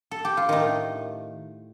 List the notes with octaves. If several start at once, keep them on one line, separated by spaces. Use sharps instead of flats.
A4
G4
F4
A2 D#3 A3 D#4